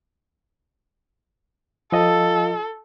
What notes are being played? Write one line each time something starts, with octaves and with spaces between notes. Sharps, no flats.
F3 F4 A4 D#5